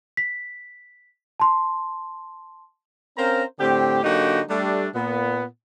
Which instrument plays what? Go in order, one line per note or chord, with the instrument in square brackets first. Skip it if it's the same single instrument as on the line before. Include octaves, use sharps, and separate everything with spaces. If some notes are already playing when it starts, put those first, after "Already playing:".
[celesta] B6
A5 C6
[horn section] C4 C#4 A#4 C5 F5 A#5
A2 D3 C4 G4
D3 F#3 A#3 D#4 F#4 G4
G3 A3 D4
A#2 B3